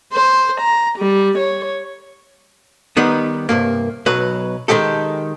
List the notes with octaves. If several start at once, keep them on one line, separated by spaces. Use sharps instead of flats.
C5
A#5
G3
C#5
D#3 G3 B3 D#4
C2 G2 A#3
B1 F#3 B4
D#3 E3 G#3 G4 A4